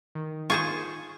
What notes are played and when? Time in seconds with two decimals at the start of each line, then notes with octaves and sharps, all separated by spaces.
0.15 D#3
0.50 F4 G#4 C5 C#6